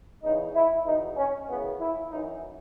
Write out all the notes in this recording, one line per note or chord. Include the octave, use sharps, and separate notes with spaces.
E2 C#3 E3 D#4
E4
E2 B2 D#4
C#4
F#2 C#3 E3 B3
E4
F#2 E3 D#4